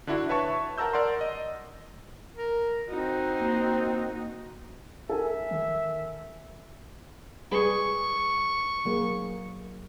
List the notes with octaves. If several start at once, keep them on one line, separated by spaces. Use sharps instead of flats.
D3 D4 E4 F#4
B4 C#5 E5 A5 C#6
A#4 F#5 A5 A#5 E6 G6
A#4 D5 F#5 C6
D#5
A#4
C4 D#4 F#4
A#3
A4 A#4 E5 G#5
D#3
G3 G#4 B4 C#6
F#3 A#3 G#4